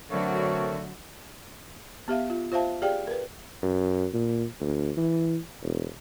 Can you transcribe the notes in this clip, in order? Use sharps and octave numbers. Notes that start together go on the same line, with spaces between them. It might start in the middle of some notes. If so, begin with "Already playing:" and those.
D3 F#3 A3 C4 F#4 A#4 C#5
B3 G4 E5 F5
F4
F4 C5 E5 F5 A5
G4 G#4 D5 F5 G5
A#4 B4
F#2
A#2
D2
E3
E1